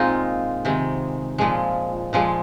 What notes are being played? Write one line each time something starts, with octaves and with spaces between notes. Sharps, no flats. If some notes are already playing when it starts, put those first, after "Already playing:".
Already playing: A#2 G#3 A#3 C4 D#4 F4
C3 D#3 G#3
A#2 F3 G#3
A#2 F3 G#3